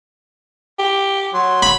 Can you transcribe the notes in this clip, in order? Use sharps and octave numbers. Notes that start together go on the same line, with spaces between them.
G4
F#3 C6
B5